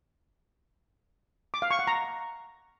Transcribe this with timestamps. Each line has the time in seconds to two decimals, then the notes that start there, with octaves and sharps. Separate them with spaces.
1.54 D6
1.62 F5
1.71 C#6
1.79 F#5
1.87 A#5